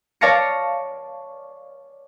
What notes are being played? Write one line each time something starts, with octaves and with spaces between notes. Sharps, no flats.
C#5 D5 F5 A5 A#6 C#7